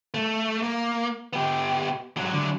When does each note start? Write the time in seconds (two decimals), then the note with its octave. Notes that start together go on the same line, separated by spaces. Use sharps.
0.14 A3
0.62 A#3
1.33 B3 G4
2.17 G#2 F#3
2.33 D3 F#3